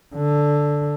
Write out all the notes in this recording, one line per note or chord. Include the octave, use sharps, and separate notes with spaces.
D3